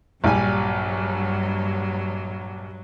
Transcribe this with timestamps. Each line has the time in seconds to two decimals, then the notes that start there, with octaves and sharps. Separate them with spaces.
0.24 A#1 G2 F#3 G3 G#5